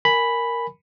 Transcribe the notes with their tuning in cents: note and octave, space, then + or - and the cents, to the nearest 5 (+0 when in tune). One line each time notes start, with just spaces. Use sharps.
A#4 +0 G#5 +0 B5 +0